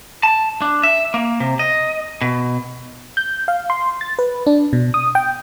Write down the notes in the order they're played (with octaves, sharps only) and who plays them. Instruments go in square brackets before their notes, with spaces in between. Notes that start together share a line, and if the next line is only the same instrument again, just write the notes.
[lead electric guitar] A5
D4
E5
A#3
C3
D#5
B2
[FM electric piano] G6
F5
C6
A6
B4
D4
B2
D#6
G5